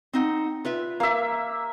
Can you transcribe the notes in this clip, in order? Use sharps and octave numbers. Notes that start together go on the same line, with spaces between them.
C4 D#4 F#5
F4 B4 E5
A#3 E5 F5